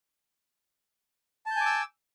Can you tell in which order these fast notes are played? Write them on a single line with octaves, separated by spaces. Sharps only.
A5 G6 G#5 D6 E6